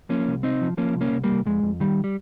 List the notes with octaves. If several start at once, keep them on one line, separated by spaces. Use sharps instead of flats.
F3 A#3 C#4
C2
C3 C4 D#4
F3
F3 A#3 C#4
C2
A#3 C#4
C2
G3 A#3
C2
F2 G#3
F2
D#3 G3
G3